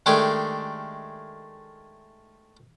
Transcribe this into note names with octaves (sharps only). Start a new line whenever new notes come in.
D#3 G#3 A3 D4 G4 G#4